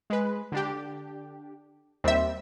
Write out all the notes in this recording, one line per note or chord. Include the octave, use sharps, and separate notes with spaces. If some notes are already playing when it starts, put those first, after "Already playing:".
G#3 B4
D3 D4 G4
D#2 G3 C4 E5